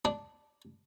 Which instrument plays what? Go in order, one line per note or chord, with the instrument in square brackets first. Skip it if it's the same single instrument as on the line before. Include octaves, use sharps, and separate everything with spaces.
[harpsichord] D4